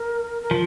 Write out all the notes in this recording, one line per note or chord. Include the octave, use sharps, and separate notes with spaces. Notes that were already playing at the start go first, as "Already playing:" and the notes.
Already playing: A#4
A#4
F3